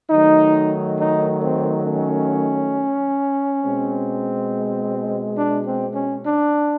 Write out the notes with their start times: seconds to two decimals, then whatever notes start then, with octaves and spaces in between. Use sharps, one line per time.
0.10 D#3 F#3 A3 D#4
0.98 D#4
1.42 C4
1.86 C#4
3.61 B2 G#3 C4
5.37 D4
5.66 C4
5.95 C#4
6.24 D4